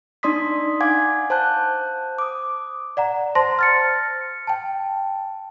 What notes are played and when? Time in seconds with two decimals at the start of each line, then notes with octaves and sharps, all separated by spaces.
0.23 D4 D#4 D5 C6 D#6 B6
0.81 F5 F#5 G#5 D6 G#6
1.30 C5 A5 F#6 G6
2.19 D6 D#6
2.97 D5 F#5 A#5
3.35 C5 A5 C6 A#6
3.59 F6 A6 C#7
4.47 G5 A5